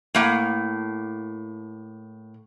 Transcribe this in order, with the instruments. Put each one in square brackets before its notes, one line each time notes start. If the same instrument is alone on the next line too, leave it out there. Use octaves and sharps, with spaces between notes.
[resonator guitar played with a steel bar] A2 A#3 F#5